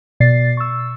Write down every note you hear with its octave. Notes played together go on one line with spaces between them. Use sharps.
B2 D5 A6 C7
C#6 E6